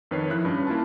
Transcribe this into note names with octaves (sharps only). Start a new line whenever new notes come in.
F2 D#3 B4 C#5 C7
F3 E4 F#6
G2 C#4
A#3 E4 F4 A5